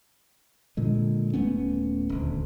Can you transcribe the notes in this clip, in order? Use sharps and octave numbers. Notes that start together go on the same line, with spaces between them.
A#2 D3 G#3
D#1 A3 B3 C#4
D#1 D2